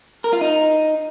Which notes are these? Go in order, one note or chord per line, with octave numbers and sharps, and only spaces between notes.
A#4
F4
D#4